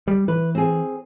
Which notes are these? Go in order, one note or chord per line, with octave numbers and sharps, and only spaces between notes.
G3
E3 B4
C4 G#4